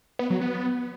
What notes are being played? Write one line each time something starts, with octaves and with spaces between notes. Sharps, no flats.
B3
F#3
B3